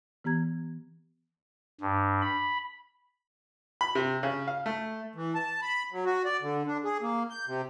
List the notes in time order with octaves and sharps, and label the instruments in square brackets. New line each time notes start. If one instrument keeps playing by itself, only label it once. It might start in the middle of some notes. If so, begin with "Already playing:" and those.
[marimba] E3 B3 G4 A#5 G#6
[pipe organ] G2
B5
[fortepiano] B5
C3
C#3
F5
A3
[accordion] E3
A5
B5
F#3
F#4
D5
D3
D4
G#4
A#3
G6
C3